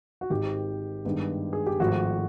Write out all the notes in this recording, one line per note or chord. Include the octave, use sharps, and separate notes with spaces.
F#4
G#1 G#2 D#3 G4
G2 D#3 G#3 B3
G#4
G4
G#1 G#2 F3 A3 F#4